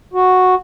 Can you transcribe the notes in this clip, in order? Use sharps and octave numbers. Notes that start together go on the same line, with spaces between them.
F#4